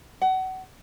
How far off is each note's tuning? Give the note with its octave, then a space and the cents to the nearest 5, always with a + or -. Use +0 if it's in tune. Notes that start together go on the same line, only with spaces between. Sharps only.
F#5 +30